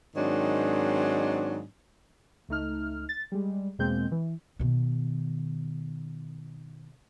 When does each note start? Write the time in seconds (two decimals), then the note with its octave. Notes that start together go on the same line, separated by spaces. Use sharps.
0.16 G#2 D#3 F#3 C4 D4
2.49 C#2 A3 D#4 F6
3.09 A6
3.32 G3 G#3
3.79 E2 B2 G#3 A#3 C4 G6
4.12 E3
4.59 B2 D#3